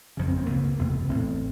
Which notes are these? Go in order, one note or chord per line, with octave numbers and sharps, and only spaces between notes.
F#1 F2 C#3 C#4
C4
C4
A#3
C#2 C#3 B3
A#3
E1 E2 C3 A3
B3
A1 A2 C4